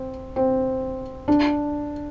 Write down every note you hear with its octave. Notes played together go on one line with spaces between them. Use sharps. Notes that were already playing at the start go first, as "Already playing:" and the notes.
Already playing: C4
C4
D4